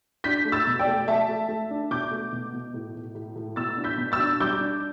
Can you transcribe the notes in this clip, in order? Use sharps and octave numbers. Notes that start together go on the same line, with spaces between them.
D4 G6 B6
A3
E6 A6
B2
D5 G5
A3
A3 E5 A5
A3
A3
D4
B2 D6 G6
A3
B2
B2
A2
A2
A2
A2
B2 E6 A6
D4
G6 B6
B2
E6 A6
D4
G3 D6 G6
D4